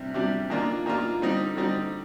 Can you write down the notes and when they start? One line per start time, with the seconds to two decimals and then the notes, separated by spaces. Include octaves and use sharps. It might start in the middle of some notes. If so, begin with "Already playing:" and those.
Already playing: C3 G3 D4
0.14 C3 G3 D4
0.50 D#3 A#3 D4 F4
0.86 D#3 A#3 D4 F4
1.21 D3 G3 C4 D#4
1.56 D3 G3 C4 D#4